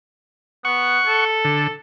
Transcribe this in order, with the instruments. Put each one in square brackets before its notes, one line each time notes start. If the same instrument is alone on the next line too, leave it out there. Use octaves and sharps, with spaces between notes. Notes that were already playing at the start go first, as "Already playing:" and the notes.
[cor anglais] B3 [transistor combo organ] F#5 C#6
[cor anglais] A4
[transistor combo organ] D3